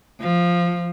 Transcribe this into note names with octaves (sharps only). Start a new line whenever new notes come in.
F3